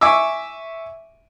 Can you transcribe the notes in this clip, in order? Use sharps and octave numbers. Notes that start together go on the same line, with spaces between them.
E5 G#5 C#6 D6 E6